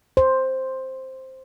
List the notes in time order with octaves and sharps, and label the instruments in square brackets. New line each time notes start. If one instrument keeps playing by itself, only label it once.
[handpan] C5